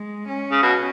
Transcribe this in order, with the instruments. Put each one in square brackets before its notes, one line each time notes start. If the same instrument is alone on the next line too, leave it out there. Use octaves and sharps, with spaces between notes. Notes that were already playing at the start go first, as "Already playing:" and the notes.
Already playing: [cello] G#3
C#4
[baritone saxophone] C#3
B2